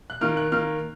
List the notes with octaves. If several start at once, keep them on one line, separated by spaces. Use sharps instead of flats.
F#6
D#3 A#3 F6
F#6
D#3 A#3 F6